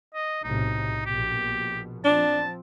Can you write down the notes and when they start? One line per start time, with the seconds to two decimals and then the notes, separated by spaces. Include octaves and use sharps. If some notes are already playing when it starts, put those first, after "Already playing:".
0.15 D#5
0.44 B1 A2 C3 D#4
1.06 A#1 B2 G4
2.04 F3 C4 D4 A5